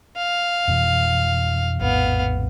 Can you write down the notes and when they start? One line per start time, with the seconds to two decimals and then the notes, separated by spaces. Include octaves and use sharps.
0.17 F5
0.68 F2 B2 E3
1.81 A#1 F2 A2 B3 F5